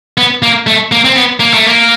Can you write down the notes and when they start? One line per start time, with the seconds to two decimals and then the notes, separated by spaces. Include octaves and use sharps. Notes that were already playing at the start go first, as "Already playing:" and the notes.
0.17 B3
0.43 A#3
0.67 A3
0.92 A#3
1.05 C4
1.16 B3
1.40 A#3
1.54 A3
1.67 A#3